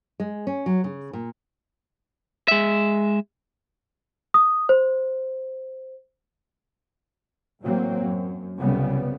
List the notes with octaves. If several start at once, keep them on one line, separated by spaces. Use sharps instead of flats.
G#3
C#4
F#3
C#3
A#2
G#3 E5
D#6
C5
A1 A2 F#3 A#3 C4
F#2
C2 F#2 C#3 G3 B3